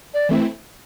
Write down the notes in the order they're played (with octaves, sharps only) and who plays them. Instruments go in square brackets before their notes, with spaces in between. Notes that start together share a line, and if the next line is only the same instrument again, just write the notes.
[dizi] D5
[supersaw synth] E3 A3 C4 E4